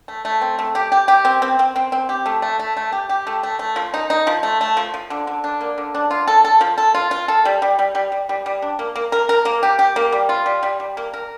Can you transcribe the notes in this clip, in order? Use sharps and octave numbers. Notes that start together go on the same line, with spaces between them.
A3
A3
C4
A3
G4
G4
G4
C4
C4
C4
C4
C4
G4
A3
A3
A3
A3
G4
G4
A3
A3
A3
F3
D#4
D#4
F3
A3
A3
F3
F3
D3
D3
D4
A#3
D3
D4
F4
A4
A4
F3
A4
F4
F4
A4
G3
G3
G3
G3
G3
G3
G3
D4
A#3
A#3
A#4
A#4
A#3
G4
G4
A#3
G3
F4
G3
G3
G3
A#3
A#4